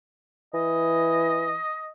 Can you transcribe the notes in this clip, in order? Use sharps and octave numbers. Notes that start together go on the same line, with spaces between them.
E3 D#5